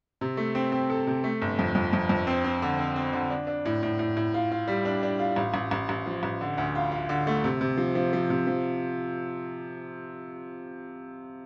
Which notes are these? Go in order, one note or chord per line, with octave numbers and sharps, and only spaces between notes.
C3
A3
C4
C4
A4
C3
A3
G1
F2
F2
F2
F2
C4
C4
D3
C4
C4
D3
D4
D4
A2
A2
A2
A2
F4
F4
G3
D4
D4
F4
A1
A1
A1
A1
F3
A1
D3
D2
F4
F4
D3
A3
C3
C3
F3
F3
F3
C3
F3